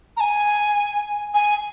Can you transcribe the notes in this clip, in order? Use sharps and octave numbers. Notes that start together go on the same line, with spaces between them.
A#5
G#5
G#5